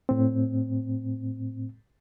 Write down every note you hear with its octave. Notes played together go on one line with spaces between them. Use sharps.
A2 C4